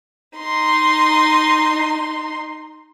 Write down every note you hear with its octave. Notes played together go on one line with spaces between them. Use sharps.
D#4 C6